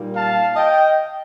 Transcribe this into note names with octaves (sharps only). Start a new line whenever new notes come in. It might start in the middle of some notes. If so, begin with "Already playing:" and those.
Already playing: A#2 G3 A#3 D#4
F5 A5
D#5 G5